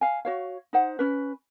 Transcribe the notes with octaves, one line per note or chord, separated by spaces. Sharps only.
F5 G#5
F#4 C#5 F5
D#4 C5 F#5
C#4 B4